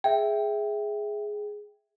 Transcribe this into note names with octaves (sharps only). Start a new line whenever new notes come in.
G#4 E5 G5